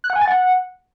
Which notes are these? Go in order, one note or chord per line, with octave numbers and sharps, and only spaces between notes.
F#6
F#5
G#5
A6
F#5